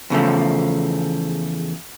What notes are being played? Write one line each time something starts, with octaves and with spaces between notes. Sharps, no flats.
E2 C#3 F3 A3